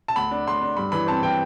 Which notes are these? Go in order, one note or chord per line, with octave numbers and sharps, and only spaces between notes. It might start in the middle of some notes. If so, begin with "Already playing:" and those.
A5
D2 B5
D4
D2 C6
D4
G2 B5
E3 B5
C4 A5
E3 G5